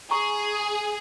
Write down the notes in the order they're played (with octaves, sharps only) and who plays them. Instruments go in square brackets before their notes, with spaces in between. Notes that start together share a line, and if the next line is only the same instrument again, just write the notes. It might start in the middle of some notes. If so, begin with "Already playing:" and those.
[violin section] G#4 [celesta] A#5 C#6